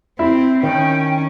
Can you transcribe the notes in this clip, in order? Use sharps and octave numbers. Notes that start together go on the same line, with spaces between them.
C4 E4
D#3 C#4 G5